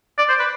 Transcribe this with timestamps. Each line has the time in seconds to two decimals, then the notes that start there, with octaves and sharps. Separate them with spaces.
0.18 D5
0.29 C5
0.39 B4